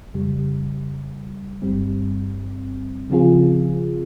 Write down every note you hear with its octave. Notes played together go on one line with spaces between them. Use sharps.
F2 C#3 G3
G1 G2 G3 C4
C#3 F3 C4 F4 G#4